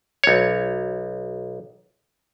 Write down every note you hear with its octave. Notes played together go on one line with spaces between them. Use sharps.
B1 C#5